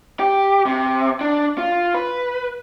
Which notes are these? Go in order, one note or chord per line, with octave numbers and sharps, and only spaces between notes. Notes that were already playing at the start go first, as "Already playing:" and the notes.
G4
C3
D4
F4
B4